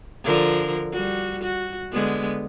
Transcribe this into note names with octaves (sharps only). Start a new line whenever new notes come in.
D3 F3 A#4
G3 F#4
F#4
D3 G#3 B3